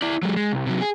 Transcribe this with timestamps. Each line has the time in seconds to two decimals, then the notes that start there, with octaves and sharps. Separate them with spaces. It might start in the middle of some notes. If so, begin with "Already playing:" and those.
0.02 E4 D5
0.23 F#3 G#3
0.36 G#3
0.52 C2
0.66 C3 F#3
0.81 G#4